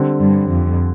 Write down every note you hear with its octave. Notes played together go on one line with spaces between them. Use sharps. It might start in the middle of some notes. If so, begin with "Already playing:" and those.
Already playing: D3 G3 C4
G2
F2